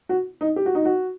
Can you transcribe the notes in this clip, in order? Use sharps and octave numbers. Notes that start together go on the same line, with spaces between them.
F#4
D#4
G4
F#4
D#4
F#4